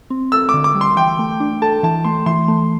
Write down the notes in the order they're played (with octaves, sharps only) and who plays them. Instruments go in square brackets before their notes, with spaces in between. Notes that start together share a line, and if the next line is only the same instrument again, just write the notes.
[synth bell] C4
[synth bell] A4 [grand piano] E6
[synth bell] D3 [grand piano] D6
[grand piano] D6
[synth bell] G3
[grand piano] C6
[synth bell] E3 [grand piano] G5
[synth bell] A3
D4
[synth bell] A4 [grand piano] A5
[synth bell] E3 [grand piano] A5
[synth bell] A3 [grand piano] C6
[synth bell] E3 [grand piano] C6
[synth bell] A3